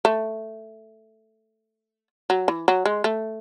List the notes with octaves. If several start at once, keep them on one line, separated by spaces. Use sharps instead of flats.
A3
F#3
E3
F#3
G#3
A3